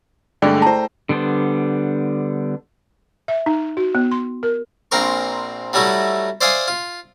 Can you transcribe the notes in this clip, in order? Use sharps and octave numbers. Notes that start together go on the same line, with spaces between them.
G2 D3 G#3 A3 G#4 D5 G5
E4 C5 A5 A#5
D3 G3 B3 D4 C5
E5
D#4
F#4
B3
C6
A#4
A#1 A#2 C4 A#4 C#6
F#3 G3 A3 E4 F#4
C5 D5 E5 F5 G#5 D#6
F4